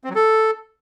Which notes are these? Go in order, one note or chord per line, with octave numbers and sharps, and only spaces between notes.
C4
F#3
A4